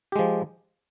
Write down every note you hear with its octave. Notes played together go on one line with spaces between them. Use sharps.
F3 G#3 G4